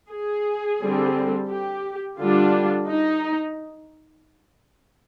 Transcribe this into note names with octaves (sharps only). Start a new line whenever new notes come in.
G#4
D3 G3 C4
G4
D3 G3 D4 F4
D#4